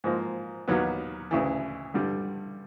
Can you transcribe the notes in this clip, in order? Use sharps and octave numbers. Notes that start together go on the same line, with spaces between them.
G#2 F3 A#3
D#2 D#3 F#3 B3
D2 C#3 E3
G2 D3 G3